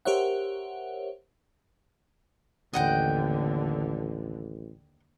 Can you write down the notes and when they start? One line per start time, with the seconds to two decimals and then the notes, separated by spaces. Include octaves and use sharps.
0.05 G4 A#4 C5 C#5 E5 F#5
2.74 A1 D#2 D3 D#5 F#5 G5